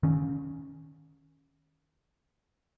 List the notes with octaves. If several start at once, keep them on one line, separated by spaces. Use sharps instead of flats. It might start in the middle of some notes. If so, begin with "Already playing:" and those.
D#3 C#4